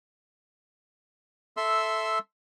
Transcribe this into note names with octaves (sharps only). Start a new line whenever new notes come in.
A4 E5 C6 E6